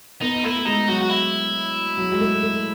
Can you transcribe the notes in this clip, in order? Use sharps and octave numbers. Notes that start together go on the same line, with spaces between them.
B3 D#4
A3 E4
G#3 D#4
F#3 F#4
F#4
E4
F#3
G#3
A3
A3